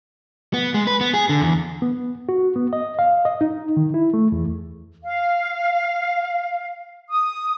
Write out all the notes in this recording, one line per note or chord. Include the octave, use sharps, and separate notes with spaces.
B3
G#3
B4
B3
G#4
D3
E2
B3
F#4
B3
D#5
F5
D#5
D#4
D#3
E4
A3
E2
F5
D#6